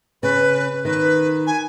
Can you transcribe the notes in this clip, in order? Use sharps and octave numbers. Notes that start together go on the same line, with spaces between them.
C#3 B4
D#3 B4
G#5